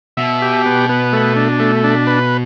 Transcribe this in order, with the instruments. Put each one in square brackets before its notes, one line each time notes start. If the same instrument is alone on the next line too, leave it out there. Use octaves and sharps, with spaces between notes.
[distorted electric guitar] B2 [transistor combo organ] E5
[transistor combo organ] G4
B3
B3
A3
D4
A3
D4
B4